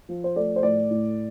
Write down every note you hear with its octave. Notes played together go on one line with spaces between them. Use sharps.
F3
C5
A3 D5
C5
A2 D5
A2